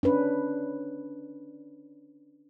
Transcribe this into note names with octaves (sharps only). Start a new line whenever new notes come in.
C#4 D4 B4